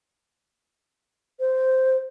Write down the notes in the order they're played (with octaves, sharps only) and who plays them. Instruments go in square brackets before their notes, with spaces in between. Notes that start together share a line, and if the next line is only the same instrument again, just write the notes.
[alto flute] C5